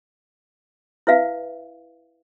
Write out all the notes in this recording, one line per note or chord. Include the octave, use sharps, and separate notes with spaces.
E4 B4 E5 F5